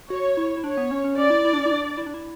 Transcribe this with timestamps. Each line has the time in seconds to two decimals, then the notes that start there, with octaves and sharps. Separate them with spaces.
0.10 F#4 C#5
0.37 E4
0.57 E4
0.64 D4 C#5
0.77 B3
0.91 C#4
1.04 C#4
1.17 C#4 D5
1.30 E4
1.45 E4
1.53 D4
1.58 C#4
1.66 E4
1.71 D4
1.97 E4
2.06 D4
2.14 E4